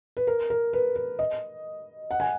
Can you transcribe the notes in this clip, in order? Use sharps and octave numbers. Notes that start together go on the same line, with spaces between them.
B4
A#4
A#4
B4
B4
D#5
F#5
G#5